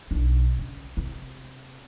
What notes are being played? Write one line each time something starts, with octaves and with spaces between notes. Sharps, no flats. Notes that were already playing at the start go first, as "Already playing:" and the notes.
B1 D4
C#3
C3